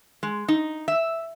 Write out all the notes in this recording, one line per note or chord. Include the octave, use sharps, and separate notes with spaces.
G#3
D#4
E5